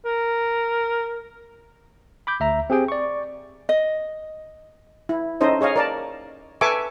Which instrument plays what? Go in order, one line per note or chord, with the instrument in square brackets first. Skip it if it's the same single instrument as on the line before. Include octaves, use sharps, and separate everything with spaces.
[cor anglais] A#4
[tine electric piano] B5 D6 G6
D2 E5 A#5
C4 G4 G#4 G5
D5 C#6
[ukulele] D#5
[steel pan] E4
C#4 D#4 A4 C5 D#5
G#4 C#5 D#5 F5
A#4 D5 A5
A4 B4 E5 G#5 C#6 D6